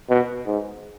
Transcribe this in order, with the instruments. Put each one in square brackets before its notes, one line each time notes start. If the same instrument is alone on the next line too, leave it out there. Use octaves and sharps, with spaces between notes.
[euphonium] B2
G#2